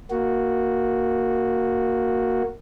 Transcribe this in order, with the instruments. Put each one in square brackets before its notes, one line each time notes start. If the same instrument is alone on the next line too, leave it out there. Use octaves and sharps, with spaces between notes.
[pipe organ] A#3 F#4